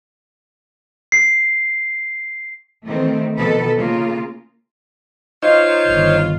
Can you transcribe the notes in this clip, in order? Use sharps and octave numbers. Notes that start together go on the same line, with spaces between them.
C7
D#3 E3 A3 C4
B2 D#3 F3 A4 B4
C#3 A#3 F4
D#4 F4 C5 C#5 D#5
G1 D#3